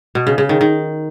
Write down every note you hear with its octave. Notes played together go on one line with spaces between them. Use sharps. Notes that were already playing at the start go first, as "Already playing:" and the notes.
B2
C#3
C#3
D#3
D#3